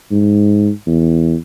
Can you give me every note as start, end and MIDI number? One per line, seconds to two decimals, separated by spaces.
0.11 0.70 44
0.86 1.36 40